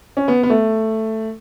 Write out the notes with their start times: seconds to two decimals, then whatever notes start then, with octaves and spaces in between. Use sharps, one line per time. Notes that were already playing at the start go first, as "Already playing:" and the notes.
0.17 C#4
0.28 B3
0.43 B3
0.50 A3